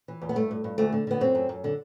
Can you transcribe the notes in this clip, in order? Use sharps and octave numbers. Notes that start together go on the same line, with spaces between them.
E3
E2
B3
G2 A3
G2
G2
D2 A3
D3
D3 B3
F#2 C4
F#2
F#2
D3